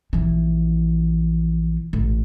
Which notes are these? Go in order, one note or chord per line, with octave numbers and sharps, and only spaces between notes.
A#1 E3
A1